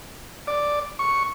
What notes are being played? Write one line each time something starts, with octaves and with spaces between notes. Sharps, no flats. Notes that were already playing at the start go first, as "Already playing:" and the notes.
D5
C#6